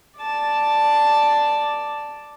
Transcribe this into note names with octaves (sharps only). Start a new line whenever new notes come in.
D5 A5